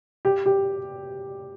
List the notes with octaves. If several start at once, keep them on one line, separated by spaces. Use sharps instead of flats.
G4
G4